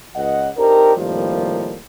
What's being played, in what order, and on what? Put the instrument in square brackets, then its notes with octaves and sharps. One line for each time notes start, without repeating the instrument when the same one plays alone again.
[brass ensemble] C#2 D#5 F#5
C4 D4 D#4 G4 A#4
A2 C3 D#3 F3 G3 A#3